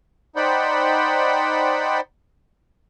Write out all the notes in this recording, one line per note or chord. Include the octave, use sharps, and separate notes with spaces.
D#4 C5 D5 F#5 G5 B5